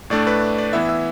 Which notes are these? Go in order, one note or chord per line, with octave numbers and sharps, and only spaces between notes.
A2 A3 D4 D5
B4
D5
E3 B3 E4 E5
E5